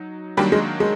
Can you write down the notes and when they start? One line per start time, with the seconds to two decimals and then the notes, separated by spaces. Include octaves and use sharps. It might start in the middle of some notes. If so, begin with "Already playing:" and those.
Already playing: F#3 D#4
0.37 D#3 F#3 G3 A#3 D4
0.52 G#3
0.80 G#3